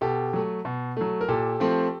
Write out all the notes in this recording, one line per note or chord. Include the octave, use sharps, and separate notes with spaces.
B2 G4 A4
F#3 A3
B2
F#3 A3
A#4
A#2 G4 A4
F3 A3 C4